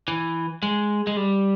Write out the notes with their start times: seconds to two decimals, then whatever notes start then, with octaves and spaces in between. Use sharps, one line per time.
0.08 E3
0.63 G#3
1.07 G#3
1.16 G3